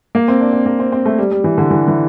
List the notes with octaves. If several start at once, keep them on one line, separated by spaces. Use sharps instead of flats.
A#3
C4
D4
C4
A#3
C4
C4
A3
G3
G3
E3
D3
E3
E3